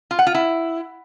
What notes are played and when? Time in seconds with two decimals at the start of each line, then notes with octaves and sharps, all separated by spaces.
0.11 F4
0.19 F#5
0.27 F4
0.35 E4